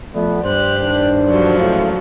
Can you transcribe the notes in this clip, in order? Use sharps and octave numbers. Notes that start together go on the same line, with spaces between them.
F3 A3 B3 D5
G2 G4 C5 F#6
D#3 D4 D5
D3 F3 F#3 D5
C#2 A2 F5